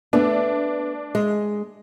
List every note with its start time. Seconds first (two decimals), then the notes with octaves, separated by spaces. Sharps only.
0.13 A3 B3 D4
1.15 G#3